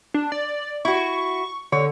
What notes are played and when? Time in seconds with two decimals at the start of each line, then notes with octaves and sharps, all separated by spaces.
0.14 D4
0.32 D5
0.85 E4 F#4 C#6
1.72 D3 C#5